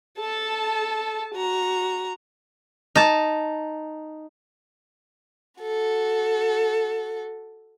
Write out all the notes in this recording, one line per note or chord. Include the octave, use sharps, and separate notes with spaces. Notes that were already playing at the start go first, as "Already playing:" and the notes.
A4 A5
F#4 A#5
D#4 A5
F#4 A4